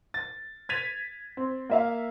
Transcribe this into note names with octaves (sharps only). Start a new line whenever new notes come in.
A6
G#6 A6 B6 D#7 F7
C4
A#3 E5 F5